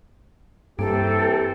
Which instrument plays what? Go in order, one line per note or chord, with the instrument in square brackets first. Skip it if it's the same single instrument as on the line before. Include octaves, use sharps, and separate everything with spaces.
[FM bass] G2 [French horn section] E3 C4 G4 [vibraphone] A#3 [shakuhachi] A4